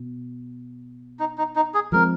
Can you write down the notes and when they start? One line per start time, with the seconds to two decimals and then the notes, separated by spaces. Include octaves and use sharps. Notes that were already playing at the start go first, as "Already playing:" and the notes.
Already playing: B2
1.19 D#4
1.38 D#4
1.56 D#4
1.74 G#4
1.92 F3 G#3 C4 A#4